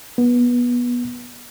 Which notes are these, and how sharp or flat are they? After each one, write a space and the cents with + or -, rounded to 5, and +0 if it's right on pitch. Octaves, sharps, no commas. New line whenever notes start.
B3 -20